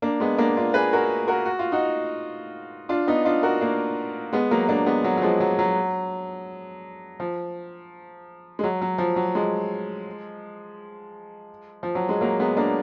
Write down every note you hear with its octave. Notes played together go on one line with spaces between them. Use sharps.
A#3 D4
G#3 B3
A#3 D4
D4 F4
G#4 B4
F#4 A#4
F#4 A#4
F#4
F4
D#4 F#4
D4 F4
B3 D#4
D4 F4
F#4 A#4
A#3 D4
G#3 B3
F#3 A#3
A#3 D4
G#3 B3
F#3
F#3
F3 G#3
F#3
F#3
F3
G#3
F#3
F#3
F3
F#3
F3 G#3
F3
F#3
G#3
F#3 A#3
G#3 B3
A#3 D4